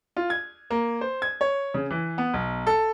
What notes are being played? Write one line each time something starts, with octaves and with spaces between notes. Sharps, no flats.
F4
G#6
A#3
C5
G#6
C#5
C#3
E3
B3
B1
A4